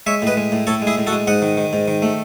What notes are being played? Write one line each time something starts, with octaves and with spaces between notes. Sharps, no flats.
G#3 C#5 E5
A2 B4 D#5
G#3
A2
A2 A4 C#5
G#3
E4 G#4
A2
F#4 A4
G#3
G#2 D#5 F#5
D#3
D#3
G#2
D#3
A3